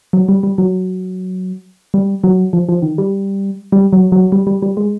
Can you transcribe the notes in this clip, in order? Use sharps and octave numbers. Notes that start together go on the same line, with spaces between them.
F#3
G3
G3
F#3
G3
F#3
F3
F3
D#3
G3
G3
F#3
F#3
G3
G3
G3
G#3